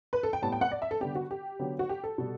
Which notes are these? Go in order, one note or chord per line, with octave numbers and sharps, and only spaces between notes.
B4
A4
G5
A2 G3 B3 A5
G5
F#5
D5
E5
A4
D3 G3 B3 G4
F#4
G4
D3 F#3 B3
F#4
G4
A4
B2 G3